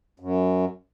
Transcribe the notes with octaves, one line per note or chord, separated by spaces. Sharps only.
F#2